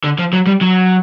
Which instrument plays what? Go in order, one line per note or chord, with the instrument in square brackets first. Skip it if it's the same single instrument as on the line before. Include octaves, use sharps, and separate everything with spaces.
[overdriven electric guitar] D3
F3
F#3
G3
F#3